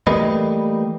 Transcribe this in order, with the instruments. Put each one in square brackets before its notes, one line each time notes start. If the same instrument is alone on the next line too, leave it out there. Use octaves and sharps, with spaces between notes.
[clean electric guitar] E3 G3 A3 A#3 B4 D#5